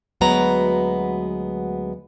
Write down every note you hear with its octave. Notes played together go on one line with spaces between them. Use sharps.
D2 F#3 G#3 B3 B4 A#5